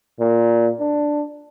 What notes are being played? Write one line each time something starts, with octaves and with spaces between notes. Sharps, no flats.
A#2
D4